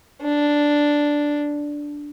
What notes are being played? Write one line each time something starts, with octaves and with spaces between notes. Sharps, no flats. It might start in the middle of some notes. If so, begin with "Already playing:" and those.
D4